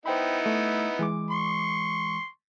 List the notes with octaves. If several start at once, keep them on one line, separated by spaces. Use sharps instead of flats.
B3 D#4 E4 C5 G5 B5
A3
E3 G#3 D6
C6 C#6